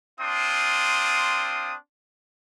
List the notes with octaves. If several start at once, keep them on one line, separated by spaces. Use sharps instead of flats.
C4 D4 F4 C6 D#6